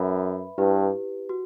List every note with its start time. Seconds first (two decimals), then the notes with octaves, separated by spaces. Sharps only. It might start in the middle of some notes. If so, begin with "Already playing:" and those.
Already playing: F#2 B4 E5 B5
0.58 G2 E4 G4 B4
1.29 F#4